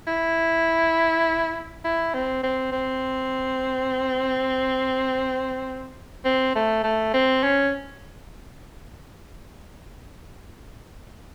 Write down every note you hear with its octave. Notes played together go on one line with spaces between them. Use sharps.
E4
E4
C4
C4
C4
C4
A3
A3
C4
C#4